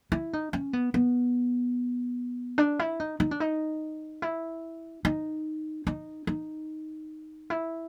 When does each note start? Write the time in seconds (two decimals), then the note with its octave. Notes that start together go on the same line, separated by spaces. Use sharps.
0.12 E4
0.33 D#4
0.53 C#4
0.73 B3
0.94 B3
2.58 D4
2.79 E4
3.00 D#4
3.20 D#4
3.31 D4
3.40 D#4
4.22 E4
5.05 D#4
5.87 D#4
6.27 D#4
7.50 E4